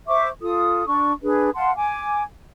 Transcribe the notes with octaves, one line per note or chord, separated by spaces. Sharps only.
C5 E5 C#6 D6
F4 A4 D#6
D4 C#6
D4 G#4 B4
F5 F#5 A5 C6
G#5 D6